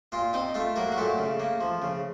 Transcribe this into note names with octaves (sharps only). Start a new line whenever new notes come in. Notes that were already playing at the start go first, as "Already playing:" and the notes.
A#2 F4 F5
C4 D#4 D#5
A3 F4 F5
F#3 A#3 A#4
F#4
A#2 A3 A4
C#3
A#3
F3
C#3